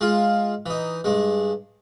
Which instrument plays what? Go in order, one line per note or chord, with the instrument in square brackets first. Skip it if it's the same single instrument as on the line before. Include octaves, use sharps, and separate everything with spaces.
[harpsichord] G#3 F4
E3 D#4
G2 G#3